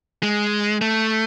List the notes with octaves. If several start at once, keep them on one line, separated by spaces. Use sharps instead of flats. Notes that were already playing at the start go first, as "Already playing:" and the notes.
G#3
A3